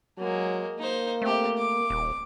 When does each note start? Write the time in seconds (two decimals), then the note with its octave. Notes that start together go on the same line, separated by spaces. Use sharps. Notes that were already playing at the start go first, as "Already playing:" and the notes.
0.18 F#3 G#3 A#3
0.79 A#3 D#4 C5
1.22 A3 C4 G4
1.57 D6
1.90 D#1